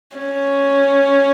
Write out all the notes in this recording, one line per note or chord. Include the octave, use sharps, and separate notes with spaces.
C#4